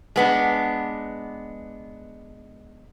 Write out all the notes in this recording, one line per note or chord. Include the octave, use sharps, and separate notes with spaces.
G#3 B3 D4